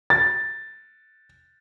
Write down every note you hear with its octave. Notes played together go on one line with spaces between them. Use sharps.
A6